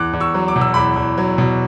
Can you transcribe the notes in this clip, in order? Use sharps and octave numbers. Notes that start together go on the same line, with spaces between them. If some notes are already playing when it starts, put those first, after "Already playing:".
Already playing: E2 D6 F#6
E2
C#6 E6
F#3
D6
B2
E6
E2 B5 D6
E2
F#3
B2